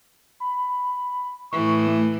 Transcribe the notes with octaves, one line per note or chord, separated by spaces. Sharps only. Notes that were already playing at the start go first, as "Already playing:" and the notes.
B5
A2 E3 C#6
A3